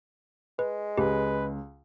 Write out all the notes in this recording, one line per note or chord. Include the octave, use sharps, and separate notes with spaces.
G#3 B4
C#2 G4 B4